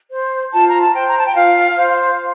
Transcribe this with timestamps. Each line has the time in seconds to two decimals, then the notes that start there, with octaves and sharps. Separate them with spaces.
0.10 C5
0.52 F4 A5
0.68 A#5
0.81 A5
0.94 C5 G5
1.08 A#5
1.18 A5
1.26 G5
1.35 F4 F5
1.77 C5